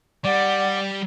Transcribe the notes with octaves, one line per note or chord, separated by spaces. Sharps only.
G3 D5 F#5